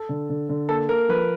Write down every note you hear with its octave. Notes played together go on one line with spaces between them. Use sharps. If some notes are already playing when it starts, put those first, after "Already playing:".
Already playing: A4
D3
D3
D3
A#3 A4
A#3 A#4
F3 B4